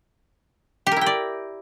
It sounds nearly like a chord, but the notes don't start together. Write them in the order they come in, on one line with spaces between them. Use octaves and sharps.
G4 A#4 E4 G5 D5